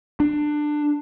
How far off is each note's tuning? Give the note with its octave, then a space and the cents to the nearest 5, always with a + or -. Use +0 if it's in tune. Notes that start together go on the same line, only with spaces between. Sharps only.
D4 +20